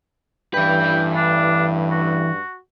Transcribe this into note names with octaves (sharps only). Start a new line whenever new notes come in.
A1 G2 E3 B4 G5
D4
F#4